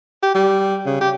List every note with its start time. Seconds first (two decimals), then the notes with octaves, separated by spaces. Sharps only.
0.23 G4
0.35 G3
0.86 C#3
1.01 G4